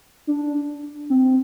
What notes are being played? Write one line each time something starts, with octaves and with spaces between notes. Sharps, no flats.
D4
C4